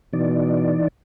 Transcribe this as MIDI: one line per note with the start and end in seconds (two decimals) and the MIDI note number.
0.13 0.77 47
0.13 0.88 52
0.13 0.88 63
0.13 0.88 74